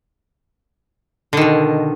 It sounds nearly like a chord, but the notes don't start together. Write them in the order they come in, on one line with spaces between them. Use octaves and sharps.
D3 D#3 B2